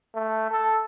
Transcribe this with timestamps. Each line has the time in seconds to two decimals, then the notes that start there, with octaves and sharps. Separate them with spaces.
0.15 A3
0.51 A4